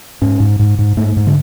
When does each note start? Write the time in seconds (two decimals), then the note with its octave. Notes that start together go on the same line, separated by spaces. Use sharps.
0.22 G#2 C#4
0.40 G#2
0.59 G#2
0.79 G#2
0.97 G#2 A3
1.17 G#2
1.27 D3